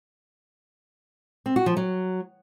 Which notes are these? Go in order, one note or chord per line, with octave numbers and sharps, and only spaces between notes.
C4
F#4
F3
F#3